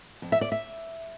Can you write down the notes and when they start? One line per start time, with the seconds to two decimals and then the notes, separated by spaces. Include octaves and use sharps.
0.22 F2
0.32 E5
0.41 D5
0.52 E5